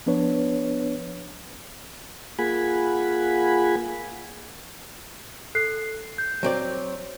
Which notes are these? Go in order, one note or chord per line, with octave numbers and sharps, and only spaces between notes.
F3 B3 D4 B4 C#5
A#3 F4 G#4 F#5 G#5 B5
A4 F#6 C7
G6
F#3 C4 D5